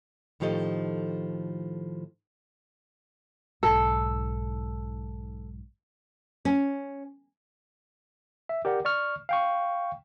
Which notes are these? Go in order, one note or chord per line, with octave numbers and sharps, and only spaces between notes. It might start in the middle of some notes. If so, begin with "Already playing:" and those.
A2 D#3 F3 G4 A4 D#5
B1 G#2 A4
C#4
E5
G4 A#4 D5 F#5
D5 C#6 F6
F5 G5 C#6